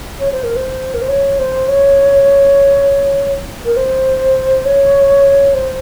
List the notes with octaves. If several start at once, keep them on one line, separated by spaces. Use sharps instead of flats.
C#5
C5
A#4
C5
A#4
C5
C#5
C5
C#5
A#4
C5
C#5
C5